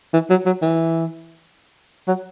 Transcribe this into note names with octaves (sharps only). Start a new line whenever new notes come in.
E3
F#3
F#3
E3
F#3